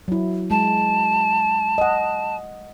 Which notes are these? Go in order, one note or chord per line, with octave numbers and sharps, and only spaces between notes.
F#3 E4
G#3 A5
D#5 F#5